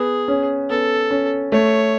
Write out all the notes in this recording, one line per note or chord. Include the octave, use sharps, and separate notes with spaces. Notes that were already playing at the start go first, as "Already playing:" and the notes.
Already playing: B3 G#4
C#4
B3 A4
C#4
A3 C#5